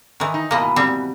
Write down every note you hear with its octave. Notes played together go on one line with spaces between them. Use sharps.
D#3 E3
D#4
G#2 B2 E3 A#3 D#5
G3 C4